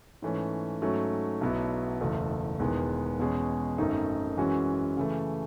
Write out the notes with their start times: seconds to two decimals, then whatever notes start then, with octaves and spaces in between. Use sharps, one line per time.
0.22 G#2 E3 A3 C#4
0.82 G#2 F#3 A3 C#4
1.41 B1 B2 F#3 B3 E4
2.01 F#1 E2 B2 A3
2.59 E1 E2 D#3 G#3 B3
3.19 E2 B2 G#3 C#4 G#4
3.78 G#1 F#2 D#3 A3 D#4
4.37 F#2 E3 G#3 C#4 F#4
4.97 C#3 E3 A3